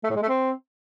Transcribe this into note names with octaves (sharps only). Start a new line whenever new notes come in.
A3
A2
G#3
A3
C4